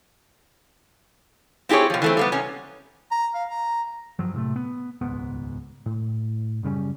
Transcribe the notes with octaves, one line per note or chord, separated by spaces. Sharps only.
C4 E4 G4 G#4 C#5
B2 F3
E3 A3 C4
G3 A#3 B3
C3 C#4
A#5
F5
A#5
G2 F3 F#3
A2 C3 A3
B3
D#1 C#2 G#2 B3
A2
F#2 C#3 G3 C#4